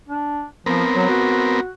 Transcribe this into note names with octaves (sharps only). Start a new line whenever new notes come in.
D4
F3 B3 C4 A#4
F#3
F#4